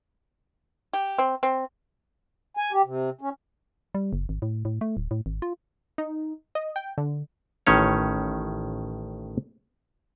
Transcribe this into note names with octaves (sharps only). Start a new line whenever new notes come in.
G4
C4
C4
G#5
G4
C3
C#4
G3
F#1
G#1
A2
A2
A3
D1
A2
G#1
F4
D#4
D#5
G5
D3
A1 A2 D#3 C#4 C#5